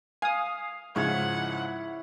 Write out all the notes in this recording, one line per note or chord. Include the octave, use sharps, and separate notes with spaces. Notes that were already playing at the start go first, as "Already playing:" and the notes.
F5 G#5 D#6
G#2 C#3 F3 E4 C#5 F#5